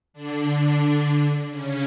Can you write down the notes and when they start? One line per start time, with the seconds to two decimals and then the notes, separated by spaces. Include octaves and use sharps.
0.13 D3 D4
1.51 C#3 C#4